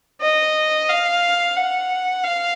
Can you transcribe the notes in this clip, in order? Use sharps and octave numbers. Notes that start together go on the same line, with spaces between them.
D#5
F5
F#5
F5